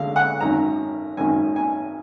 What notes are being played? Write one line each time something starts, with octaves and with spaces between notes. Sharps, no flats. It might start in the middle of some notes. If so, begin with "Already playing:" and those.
Already playing: D2 D3 G#3 F5
F#5
G#1 F#2 D#3 A#5
G#1 F#2 D#3 G#5
G#5